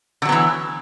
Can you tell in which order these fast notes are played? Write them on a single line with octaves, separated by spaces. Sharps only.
D3 F#3 B3 E3